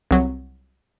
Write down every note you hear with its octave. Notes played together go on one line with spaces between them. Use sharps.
C2 F#3